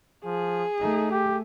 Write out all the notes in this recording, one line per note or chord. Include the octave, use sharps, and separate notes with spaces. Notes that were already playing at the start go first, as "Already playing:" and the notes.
F3 G#4
A3 D#4
G4